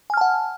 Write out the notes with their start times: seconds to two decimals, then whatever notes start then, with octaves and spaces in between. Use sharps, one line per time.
0.10 G#5
0.14 F6
0.17 A5
0.21 F#5